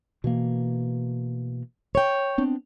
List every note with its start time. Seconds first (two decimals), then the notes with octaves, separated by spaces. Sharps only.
0.24 B2 E3 A#3
1.95 C#5 G5
2.38 B3 C4 D4